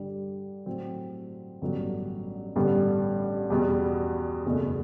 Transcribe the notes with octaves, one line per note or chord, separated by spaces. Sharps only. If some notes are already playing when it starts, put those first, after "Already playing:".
Already playing: G2 D3 G3
A2 F#3 C4
A1 G2 D3 F#3 B3
A1 G2 D3 G3 B3
E2 B2 G3 B3
F#1 E2 B2 A3